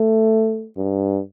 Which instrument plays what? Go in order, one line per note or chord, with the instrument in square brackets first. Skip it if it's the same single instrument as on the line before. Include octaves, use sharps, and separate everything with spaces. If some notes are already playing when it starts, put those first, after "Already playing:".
Already playing: [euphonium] A3
G2